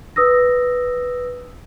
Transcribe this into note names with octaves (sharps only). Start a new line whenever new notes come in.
B4 D#6 E6 A#6